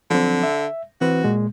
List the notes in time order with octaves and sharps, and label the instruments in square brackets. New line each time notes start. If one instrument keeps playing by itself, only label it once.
[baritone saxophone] D3 [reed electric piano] F3 F#3 C4
[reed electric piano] E5
[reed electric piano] E3 C4 B4 [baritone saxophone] F#4
[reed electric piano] A#2 G#3